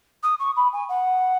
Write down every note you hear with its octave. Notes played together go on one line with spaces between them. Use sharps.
D#6
C#6
B5
G#5
F#5